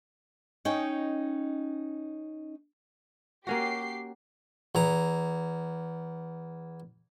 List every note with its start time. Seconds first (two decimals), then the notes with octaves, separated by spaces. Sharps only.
0.65 C#4 D#4 D#5 G5
3.47 A#3 C#4 F#4 G4 C7
4.75 E2 A#5